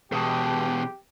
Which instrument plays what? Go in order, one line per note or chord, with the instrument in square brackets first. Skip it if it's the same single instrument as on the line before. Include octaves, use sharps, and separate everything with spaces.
[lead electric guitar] E2 B2 [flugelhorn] G4 [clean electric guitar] G#4 A5